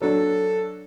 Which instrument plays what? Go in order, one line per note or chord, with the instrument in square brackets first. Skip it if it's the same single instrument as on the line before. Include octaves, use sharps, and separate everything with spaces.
[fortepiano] F#3 D4 [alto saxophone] A4